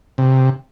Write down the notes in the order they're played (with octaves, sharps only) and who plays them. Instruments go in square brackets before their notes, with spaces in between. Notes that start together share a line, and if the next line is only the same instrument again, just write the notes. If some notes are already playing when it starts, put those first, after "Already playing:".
[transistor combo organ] C3